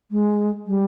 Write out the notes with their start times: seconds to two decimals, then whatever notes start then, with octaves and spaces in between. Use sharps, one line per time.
0.11 G#3
0.67 G3